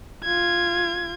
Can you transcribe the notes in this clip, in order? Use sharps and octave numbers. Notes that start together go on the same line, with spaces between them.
F4 G#6